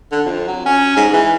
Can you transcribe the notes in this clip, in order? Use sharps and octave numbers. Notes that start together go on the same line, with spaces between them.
D3
F2
F#3
C#4
G#2
E3